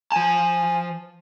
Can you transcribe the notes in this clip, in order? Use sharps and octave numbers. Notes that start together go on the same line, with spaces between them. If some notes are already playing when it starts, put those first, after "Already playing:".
F3 G#5 A5